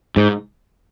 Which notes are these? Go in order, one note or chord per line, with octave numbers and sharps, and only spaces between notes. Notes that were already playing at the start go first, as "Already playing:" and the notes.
G#2